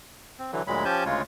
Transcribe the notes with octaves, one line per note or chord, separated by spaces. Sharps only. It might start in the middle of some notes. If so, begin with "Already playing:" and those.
C4
D3 E3 F#3
D2 A#2 F#3 G#3 B5
F3 C#4 G4 G#5 A5 G6
D2 C#3 G#3 F4 C#5